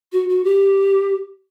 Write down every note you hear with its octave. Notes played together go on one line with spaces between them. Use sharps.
F#4
F#4
G4